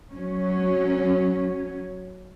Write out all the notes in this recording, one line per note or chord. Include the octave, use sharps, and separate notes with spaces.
F#3 C#4